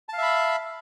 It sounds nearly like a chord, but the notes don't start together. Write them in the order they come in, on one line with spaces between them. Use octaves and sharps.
A5 F5 E5 B5